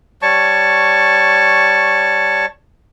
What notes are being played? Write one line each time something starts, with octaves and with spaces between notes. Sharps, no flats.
G3 C#5 A5 C#6